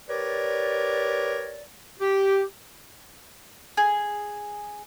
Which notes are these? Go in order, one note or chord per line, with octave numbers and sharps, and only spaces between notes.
G4 A#4 B4 C#5 D5
G4
G#4